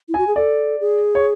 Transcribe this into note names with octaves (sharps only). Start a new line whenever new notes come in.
E4
F#4 G#5
G#4
A4 D5
G#4
C#5